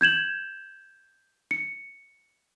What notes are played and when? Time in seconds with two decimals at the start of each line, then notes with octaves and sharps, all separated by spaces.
0.01 G6 G#6 E7 F#7
1.51 C#7